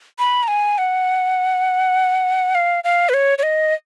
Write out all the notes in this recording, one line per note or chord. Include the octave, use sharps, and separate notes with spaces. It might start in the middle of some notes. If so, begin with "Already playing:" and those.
B5
A#5
G#5
F#5
F5
F5
B4
C#5
C#5
D#5